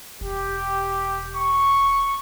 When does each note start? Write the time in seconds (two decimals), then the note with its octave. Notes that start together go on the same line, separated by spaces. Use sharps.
0.21 E1 G4
1.35 C#6